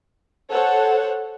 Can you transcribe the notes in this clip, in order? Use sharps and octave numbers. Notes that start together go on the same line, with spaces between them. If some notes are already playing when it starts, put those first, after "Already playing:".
A4 C5 C#5 F#5